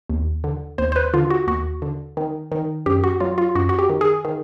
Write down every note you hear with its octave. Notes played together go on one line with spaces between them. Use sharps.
D#2
D3
D#2 C5
C5
B4
D3 F4
F#4
D#2 F#4
D3
D#3
D#3
F#2 G4
F#4
F#3 F4
F4
F#2 F#4
F#4
G4
D#3
G#4
D#3